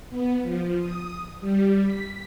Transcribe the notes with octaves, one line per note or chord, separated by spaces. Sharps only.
B3
F3
D#6
G3
B6